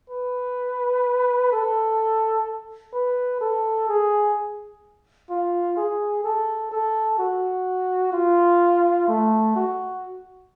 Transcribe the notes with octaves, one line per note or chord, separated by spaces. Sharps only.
B4
A4
B4
A4
G#4
F4
G#4
A4
A4
F#4
F4
A3
F#4